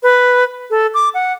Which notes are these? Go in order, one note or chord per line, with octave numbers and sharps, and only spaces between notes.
B4
A4
D6
F#5